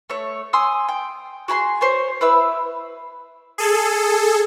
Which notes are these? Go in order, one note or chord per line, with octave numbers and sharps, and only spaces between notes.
A3 C#5
G#5 C6 D#6 E6
G5
F#4 G#4 B5 C6
C5 C#5 G#5
E4 B4 E5 E6
G#4 A4